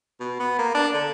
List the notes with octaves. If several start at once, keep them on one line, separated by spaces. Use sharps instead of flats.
B2
B3
A#3
D4
D3